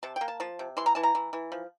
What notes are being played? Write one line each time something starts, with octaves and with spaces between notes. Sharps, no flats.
C3 A5
G5
A#3
A5
F3 A5
C3
E3 C6
A#5
E3 A5
A#5
E3
E3
F3